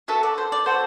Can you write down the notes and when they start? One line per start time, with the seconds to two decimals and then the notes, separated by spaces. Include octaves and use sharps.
0.08 B3 F#4 A4 E5
0.23 D5
0.38 C5
0.52 D5
0.66 B3 F#4 A4 C5